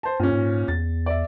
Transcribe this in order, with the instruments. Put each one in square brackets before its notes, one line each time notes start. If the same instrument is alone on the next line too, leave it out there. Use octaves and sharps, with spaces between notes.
[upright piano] C5 A5
[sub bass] G2 [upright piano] A#2 C#4
[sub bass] G#2
[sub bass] E2 [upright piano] A6
[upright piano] D5 E5